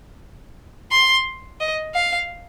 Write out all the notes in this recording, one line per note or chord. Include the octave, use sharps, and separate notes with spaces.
C6
D#5
F5